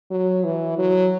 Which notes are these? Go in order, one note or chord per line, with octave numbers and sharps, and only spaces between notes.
F#3
E3
F#3